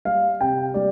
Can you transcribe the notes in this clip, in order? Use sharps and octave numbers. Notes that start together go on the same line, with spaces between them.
G3 F5
C3 G5
G3 D5